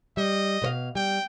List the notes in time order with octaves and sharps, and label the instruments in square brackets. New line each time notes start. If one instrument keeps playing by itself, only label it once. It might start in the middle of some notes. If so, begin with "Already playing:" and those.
[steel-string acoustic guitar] G3 [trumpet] D#5
[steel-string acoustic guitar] B2 C5 F5
[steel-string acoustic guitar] G3 [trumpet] G5